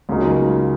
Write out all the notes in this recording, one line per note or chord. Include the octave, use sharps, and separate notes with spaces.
C#2 C#3 F#3 A#3 D#4